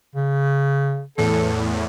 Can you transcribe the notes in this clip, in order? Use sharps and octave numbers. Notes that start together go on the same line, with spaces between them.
C#3
E2 A2 A4